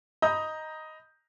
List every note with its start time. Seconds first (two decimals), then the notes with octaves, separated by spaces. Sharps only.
0.22 D#5 A#5 B5 D#6 G6